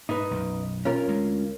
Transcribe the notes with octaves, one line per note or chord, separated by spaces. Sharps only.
G#2 D#4 B4
B1 F#2
C#4 F4 A#4
D2 G#3